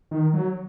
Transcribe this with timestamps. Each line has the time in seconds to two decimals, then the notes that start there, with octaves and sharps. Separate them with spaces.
0.11 D#3
0.34 F#3